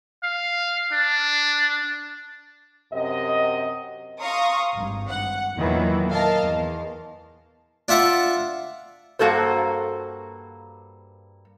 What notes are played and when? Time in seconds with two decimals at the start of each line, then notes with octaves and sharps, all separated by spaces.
0.23 F5
0.92 D4
2.92 F#2 C3 D#5
4.21 F5 A#5 C6 C#6 D#6
4.74 G#1 G2
5.09 F#5
5.57 E2 A#2 D#3 E3 F#3 A#3
6.09 A#4 D#5 F5 A5
6.42 E2
7.88 D4 F4 E5 F#5
9.19 G2 A#3 F#4 A4 C5